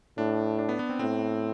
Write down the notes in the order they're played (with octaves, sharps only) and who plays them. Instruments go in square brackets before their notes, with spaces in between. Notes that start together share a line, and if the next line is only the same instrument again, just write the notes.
[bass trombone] A2 [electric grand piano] D4
[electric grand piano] D4
B3
B3
C4
[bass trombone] A2 [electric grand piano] C4